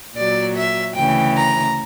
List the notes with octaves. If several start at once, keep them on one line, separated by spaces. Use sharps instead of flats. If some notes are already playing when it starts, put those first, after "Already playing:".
A#2 F#3 D5
E5
D2 C#3 E3 G5
A#5